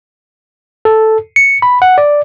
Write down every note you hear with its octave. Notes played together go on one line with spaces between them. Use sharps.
A4
C#7
B5
F#5
D5